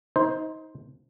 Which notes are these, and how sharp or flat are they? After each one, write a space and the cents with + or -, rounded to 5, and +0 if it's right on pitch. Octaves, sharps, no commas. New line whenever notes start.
D#4 +25 C5 +0